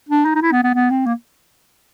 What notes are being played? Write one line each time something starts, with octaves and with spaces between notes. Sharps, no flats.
D4
D#4
D#4
E4
B3
B3
B3
C4
A#3